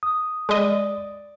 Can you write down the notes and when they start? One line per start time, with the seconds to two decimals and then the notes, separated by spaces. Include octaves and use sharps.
0.03 D#6
0.49 G#3 D5 D#5